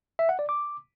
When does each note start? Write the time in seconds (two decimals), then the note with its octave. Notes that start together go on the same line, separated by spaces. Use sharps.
0.19 E5
0.29 F#5
0.39 D5
0.49 D6